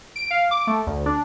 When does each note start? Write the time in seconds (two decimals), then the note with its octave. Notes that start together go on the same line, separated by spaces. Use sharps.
0.16 D7
0.31 F5
0.51 D6
0.67 A3
0.87 D2
1.06 D4